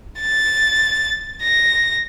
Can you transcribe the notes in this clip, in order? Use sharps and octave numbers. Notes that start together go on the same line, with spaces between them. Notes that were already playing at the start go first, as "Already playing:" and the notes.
A6
A#6